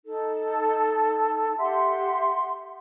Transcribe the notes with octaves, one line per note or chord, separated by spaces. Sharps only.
D#4 A4
G4 E5 F#5 C6